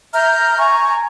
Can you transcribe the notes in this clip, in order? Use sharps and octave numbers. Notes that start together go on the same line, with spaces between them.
E5 A#5 F6 G6
G#5 A#5 C#6